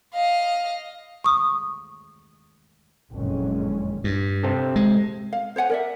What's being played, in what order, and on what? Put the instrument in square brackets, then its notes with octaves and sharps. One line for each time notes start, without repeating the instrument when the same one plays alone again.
[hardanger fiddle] D#5 F5
[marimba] C#6 D#6
[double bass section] F#1 F2 A#2 D3 G#3 C#4
[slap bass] G2
[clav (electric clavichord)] C3 C4 A4
[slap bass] G#3
[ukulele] F5
C5 C#5 F#5 G#5
A#4 D5 E5